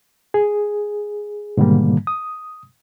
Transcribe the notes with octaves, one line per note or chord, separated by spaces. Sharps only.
G#4
G#2 B2 D3 D#3 G3 A#3
D#6